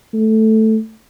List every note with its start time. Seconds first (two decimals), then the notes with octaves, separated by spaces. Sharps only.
0.14 A3